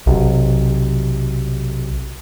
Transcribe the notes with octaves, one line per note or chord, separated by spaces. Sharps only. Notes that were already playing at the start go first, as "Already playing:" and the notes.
B1 C3